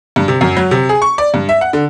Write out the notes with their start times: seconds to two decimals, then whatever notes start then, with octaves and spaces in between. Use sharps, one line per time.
0.16 G2
0.28 C3
0.41 F#2
0.57 F#3
0.71 C3
0.89 G#4
1.02 C#6
1.18 D5
1.34 G2
1.49 E5
1.61 F#5
1.73 D3